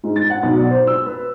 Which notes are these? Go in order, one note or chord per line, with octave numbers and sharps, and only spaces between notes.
G#2
A6
F#5
B1
D5
C5
E6
B4